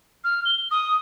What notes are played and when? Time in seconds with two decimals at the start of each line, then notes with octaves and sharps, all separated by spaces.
0.24 F6
0.45 G7
0.71 D#6